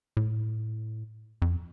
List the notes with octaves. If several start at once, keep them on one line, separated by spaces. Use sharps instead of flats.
A2
F2